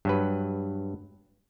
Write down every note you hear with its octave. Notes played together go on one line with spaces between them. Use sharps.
G2 F#3 B4